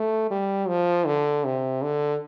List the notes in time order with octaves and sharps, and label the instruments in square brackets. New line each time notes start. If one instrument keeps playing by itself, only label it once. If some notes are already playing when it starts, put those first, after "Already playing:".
Already playing: [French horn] A3
G3
F3
D3
C3
D3